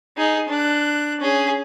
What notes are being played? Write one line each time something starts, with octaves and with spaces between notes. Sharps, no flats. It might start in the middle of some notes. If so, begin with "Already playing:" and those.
D#4 G#4
D4 F#6
C#4 G#4